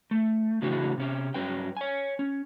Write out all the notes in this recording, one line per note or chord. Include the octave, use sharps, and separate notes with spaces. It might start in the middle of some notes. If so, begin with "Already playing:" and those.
A3
A2 C#3 E3 F#3 D4 F#4
C3 C#4 G4
G2 F#3 C#4 B4 G5
C#5 G#5
C#4